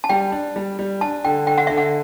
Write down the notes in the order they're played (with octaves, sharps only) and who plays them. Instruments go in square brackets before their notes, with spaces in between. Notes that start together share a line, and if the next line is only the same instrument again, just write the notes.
[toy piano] A5
[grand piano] G3 [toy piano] G5
[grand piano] D4
G3
G3
[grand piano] D4 [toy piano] A5
[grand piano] D3 [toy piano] G5
[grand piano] D3 [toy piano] G5
[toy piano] F#5
[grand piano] D3 [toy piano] E5
[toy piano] F#5